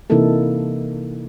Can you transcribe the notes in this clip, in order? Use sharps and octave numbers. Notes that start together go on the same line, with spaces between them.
C3 E3 A#3 D#4 E4 A4